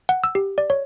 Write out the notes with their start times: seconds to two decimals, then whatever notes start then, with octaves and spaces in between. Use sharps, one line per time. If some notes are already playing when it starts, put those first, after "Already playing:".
0.09 F#5
0.24 E6
0.35 G4
0.58 D5
0.70 C#5